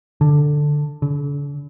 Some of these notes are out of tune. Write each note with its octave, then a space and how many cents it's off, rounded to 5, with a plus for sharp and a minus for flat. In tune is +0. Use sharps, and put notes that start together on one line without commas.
D3 +5
D3 -45